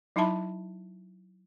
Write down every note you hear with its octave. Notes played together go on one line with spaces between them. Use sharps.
F#3 D#4 E4 E5 A5 B5